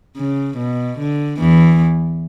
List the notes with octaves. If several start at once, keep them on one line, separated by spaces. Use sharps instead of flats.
C#3
B2
D3
E2 E3